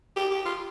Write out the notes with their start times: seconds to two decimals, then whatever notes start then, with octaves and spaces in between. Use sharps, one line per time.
0.16 G4
0.31 G4
0.45 F4